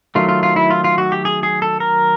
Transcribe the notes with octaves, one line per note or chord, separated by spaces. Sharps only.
D#3 F#3 A3 F4
F4
F4
E4
F4
F4
F#4
G4
G#4
G#4
A4
A#4